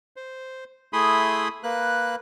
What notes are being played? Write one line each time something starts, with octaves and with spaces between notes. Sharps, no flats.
C5
A3 E4 G#4 B5 C6 D#6
A#3 B4 F#6